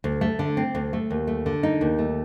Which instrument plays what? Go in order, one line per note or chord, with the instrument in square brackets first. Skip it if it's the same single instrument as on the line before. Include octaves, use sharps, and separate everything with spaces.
[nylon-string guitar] D2
A3
D3
C4
D2
A3
D#2
A3
D3
D#4
D#2
A3